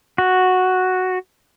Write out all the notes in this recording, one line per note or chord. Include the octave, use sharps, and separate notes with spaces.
F#4